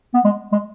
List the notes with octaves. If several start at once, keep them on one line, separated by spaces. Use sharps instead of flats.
B3
G#3
G#3